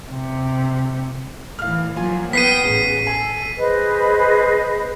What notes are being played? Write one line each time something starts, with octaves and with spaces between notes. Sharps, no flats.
C3
A2 E3 F5 F6
F3 F#3 A#3 F4 G#5
B3 G5 D#6 B6 C7 D#7
A1 C#3
A4 G#5
G#4 B4 C5 D#5